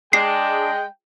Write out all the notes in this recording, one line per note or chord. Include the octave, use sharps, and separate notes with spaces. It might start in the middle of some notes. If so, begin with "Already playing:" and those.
G#3 D4 G5 C7